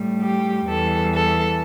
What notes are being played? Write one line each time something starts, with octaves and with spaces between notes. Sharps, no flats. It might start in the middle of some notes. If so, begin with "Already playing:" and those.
Already playing: A2 G3
G4
E2 E3 G3 A4
A4